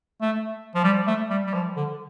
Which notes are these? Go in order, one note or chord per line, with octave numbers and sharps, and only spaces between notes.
A3
F3
G3
A3
G3
G3
F3
D3